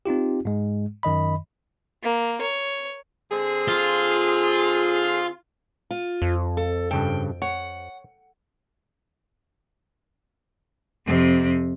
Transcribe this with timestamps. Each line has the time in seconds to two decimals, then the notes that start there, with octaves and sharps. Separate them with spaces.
0.06 C4 D#4 F4 G4
0.45 G#2 G#3
1.03 F#2 D#3 D#5 B5
2.03 A#3
2.41 C#5
3.31 D3 C4 G#4
3.68 F4
5.91 F4
6.22 F2
6.57 A4
6.91 G2 C#3 A4 G5
7.42 C#5 F#5
11.06 F2 C3